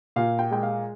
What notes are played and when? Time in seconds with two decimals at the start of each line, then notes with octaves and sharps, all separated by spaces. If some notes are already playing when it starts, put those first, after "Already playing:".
0.16 A#2 F5
0.39 G5
0.51 G#3 G5
0.63 F5